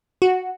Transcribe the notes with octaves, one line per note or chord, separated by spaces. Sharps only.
F#4